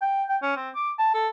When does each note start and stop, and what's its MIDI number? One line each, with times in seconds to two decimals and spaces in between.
0.02 0.24 79
0.29 0.37 79
0.42 0.52 61
0.56 0.69 60
0.75 0.91 86
0.99 1.12 81
1.14 1.28 69